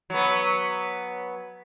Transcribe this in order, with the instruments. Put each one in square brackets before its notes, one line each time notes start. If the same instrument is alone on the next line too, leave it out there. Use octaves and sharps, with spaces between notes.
[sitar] F#3 B3